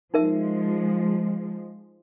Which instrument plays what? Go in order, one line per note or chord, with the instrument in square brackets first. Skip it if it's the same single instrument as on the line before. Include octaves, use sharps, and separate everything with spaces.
[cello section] F3 G#3 [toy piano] D#4 A#4 E5